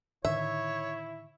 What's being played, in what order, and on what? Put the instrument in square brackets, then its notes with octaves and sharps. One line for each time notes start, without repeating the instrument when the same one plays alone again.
[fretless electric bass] A2 D3 D#3 [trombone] E4 [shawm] C#5 [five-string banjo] E5